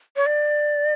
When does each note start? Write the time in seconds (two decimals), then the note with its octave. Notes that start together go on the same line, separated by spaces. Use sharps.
0.16 C#5
0.26 D5